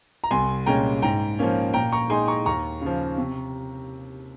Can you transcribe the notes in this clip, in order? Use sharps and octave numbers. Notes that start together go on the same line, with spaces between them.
A#5
C2 G#5 C6
A#2 G#3 C#4 G5 A#5
G#2 G5 A#5
F3 A#3 C#4
A#2 G5 A#5
A#5 C#6
G#3 D#4 G#5 C6
A#5 C#6
D#2 A#5 C#6
C#3 F3
C3